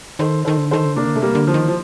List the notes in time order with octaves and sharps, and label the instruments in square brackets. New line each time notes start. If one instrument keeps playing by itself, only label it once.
[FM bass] D#3 [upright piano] A4 C5
[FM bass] D#3 [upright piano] A4 C5
[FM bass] D3
[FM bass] D#3 [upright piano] A4 C5
[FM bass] D3
[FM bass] C3 [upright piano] A#3 D4
[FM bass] D3
[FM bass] C3 [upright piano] A3
[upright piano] G3 A#3
[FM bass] D3
[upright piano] F3
[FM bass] D#3
[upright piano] F3